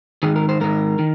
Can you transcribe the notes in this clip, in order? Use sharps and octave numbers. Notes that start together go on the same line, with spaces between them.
G#2 D#3 G#4
A#4
C5
G#2 D#3 A#4
D#3